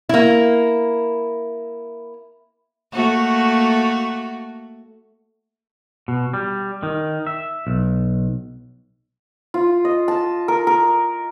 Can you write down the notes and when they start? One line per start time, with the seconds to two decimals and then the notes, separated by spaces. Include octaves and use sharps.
0.09 A#3 E4
2.92 A3 A#3 F#4
6.08 B2
6.34 G3
6.83 D#3
7.27 E5
7.67 B1
9.54 F4
9.85 D#5
10.08 A5
10.48 A#4
10.67 A#4